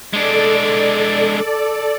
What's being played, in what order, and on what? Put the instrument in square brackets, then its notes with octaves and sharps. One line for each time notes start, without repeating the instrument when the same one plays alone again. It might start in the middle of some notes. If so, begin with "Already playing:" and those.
[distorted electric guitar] G#3 D4 [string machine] A4 D5